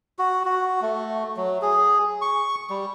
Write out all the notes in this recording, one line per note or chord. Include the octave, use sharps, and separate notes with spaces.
F#4
F#4
A3
F#3
G#4
C#6
G3